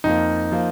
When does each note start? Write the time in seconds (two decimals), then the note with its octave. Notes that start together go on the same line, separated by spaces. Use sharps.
0.04 F2 F3 A#3 D#4
0.52 F3 A#3